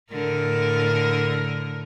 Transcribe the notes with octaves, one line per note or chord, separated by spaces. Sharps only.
A2 D3 A#4